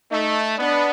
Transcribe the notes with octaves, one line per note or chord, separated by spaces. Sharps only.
A3 D#4
B3 D4